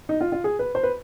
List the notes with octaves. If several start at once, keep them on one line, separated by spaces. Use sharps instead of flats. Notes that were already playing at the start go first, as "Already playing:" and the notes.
D#4
F4
F4
G#4
B4
C5
B4